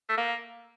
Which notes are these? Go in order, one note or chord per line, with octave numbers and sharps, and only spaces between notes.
A3
A#3